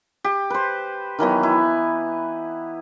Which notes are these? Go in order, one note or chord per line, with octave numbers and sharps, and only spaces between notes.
G4
B4 C5
D#3 E3 F#3 B3
E4